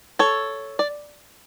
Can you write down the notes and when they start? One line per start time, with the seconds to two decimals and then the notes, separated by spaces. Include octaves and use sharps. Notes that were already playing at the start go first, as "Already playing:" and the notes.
0.19 A4 C#5
0.79 D5